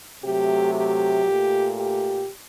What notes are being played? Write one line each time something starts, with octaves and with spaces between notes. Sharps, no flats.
C3 F#3 A3 G4
G4
A#2 A3
G4